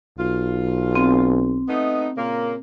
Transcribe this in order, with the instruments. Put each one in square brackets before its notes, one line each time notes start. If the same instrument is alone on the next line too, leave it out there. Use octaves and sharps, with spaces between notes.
[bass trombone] B1 [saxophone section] F4
[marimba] C4
[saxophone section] A3 B3 D#4
A#2 C#3 A#3